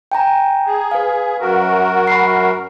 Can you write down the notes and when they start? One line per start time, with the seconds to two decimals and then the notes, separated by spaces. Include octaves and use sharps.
0.12 G5 G#5 A#5
0.67 G#4
0.91 B4 F5
1.41 F#2 F#4 A#4
2.07 B5 C7